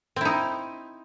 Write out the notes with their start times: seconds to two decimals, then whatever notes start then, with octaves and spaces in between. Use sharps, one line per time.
0.16 C4
0.21 E4
0.25 D#4